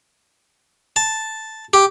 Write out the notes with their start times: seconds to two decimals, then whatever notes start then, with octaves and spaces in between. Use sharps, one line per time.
0.96 A5
1.73 G4